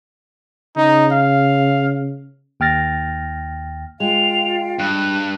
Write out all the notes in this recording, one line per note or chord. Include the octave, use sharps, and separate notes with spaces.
C#3 D#4
F5
D#2 G5 F6 A6 A#6
G#3 F4 F5 G5 F7
G2 F#6